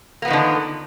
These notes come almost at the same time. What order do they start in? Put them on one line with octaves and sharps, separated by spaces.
A#3 B3 F3 D#3 D3